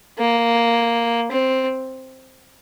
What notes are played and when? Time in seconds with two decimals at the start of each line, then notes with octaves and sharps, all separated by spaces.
0.19 A#3
1.31 C4